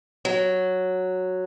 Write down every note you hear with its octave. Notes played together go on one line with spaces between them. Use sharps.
F#3